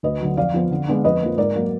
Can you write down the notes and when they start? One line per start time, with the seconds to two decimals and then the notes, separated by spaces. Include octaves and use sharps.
0.03 D2 B4 D#5
0.21 D3 F#3
0.37 F2 D5 F5
0.54 F3 B3
0.71 D3
0.88 G#3 B3 D4
1.04 F2 B4 D#5
1.21 F3 A#3
1.38 G#2 A#4 D5
1.55 F#3 A#3